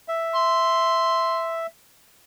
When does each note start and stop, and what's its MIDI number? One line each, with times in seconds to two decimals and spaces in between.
0.08 1.67 76
0.36 1.58 84